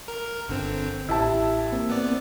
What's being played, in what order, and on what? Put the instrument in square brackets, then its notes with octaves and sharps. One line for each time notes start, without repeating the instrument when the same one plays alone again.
[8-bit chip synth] A#4
G1 D3 C4
[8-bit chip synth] A1 [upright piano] E4 G4 A5
[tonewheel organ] A#3 C4
[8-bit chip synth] B3 D5